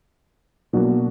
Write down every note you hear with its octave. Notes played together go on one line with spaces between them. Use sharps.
B2 F#3 A#3 D4 F#4